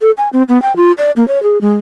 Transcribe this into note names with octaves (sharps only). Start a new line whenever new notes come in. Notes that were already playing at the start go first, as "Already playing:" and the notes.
A4
G#5
C4
B3
G5
F4
D5
A#3
C#5
G#4
G#3